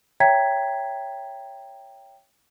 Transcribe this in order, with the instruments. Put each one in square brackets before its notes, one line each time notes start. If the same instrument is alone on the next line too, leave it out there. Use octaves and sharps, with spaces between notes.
[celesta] C#5 E5 G5 A#5 G#6 B6